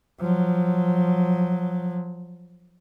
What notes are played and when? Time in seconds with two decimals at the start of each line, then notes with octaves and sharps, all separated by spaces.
0.20 F3 F#3